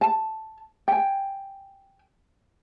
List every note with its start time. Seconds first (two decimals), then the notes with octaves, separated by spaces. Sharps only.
0.01 A5
0.88 G5 G#5